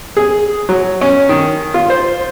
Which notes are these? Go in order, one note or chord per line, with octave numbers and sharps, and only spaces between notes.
G#4
F#3
C#4
D#3
F4
C5